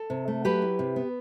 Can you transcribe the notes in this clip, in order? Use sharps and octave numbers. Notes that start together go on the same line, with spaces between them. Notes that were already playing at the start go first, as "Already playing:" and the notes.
Already playing: A4
C3
A3
F#3 G4 B4
E4
C3
B3